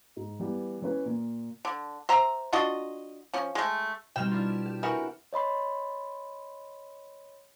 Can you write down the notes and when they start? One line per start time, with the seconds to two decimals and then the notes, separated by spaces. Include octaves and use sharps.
0.16 G#2
0.40 E3 G3 B3
0.82 E3 C#4 B4
1.05 A#2
1.65 D3
2.09 C5 E5 A#5
2.53 D4 F4 F#4 D#5
3.34 F3 C#4
3.55 G#3 A3
4.16 B2 G3 C4 D#4 G5 F6 E7
4.31 D4 E4 F4
4.66 G4
4.83 E3 F#4 A#4 F#5
5.33 C#5 D#5 B5 C6